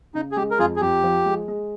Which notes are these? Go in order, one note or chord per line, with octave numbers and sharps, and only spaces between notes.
C#3 D#4
G#4
G#3 G4
A#4
F2 F4 G#4
G#4
F2 G4
F3
G#3
G#3